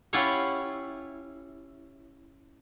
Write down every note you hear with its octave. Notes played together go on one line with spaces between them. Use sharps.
C#4 E4 F4 G4 C#5 F#5